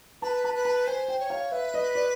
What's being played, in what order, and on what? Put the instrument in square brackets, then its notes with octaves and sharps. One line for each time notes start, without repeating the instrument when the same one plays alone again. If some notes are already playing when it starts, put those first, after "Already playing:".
[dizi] B4 [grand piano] A5
[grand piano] A5
[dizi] B4
[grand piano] A5
[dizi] C5 [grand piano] G#5
[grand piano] G5
[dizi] C#5
[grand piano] F5
[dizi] B4 [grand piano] E5
[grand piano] D#5
D5